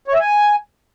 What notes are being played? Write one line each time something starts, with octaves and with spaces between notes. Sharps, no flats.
C#5
E5
G#5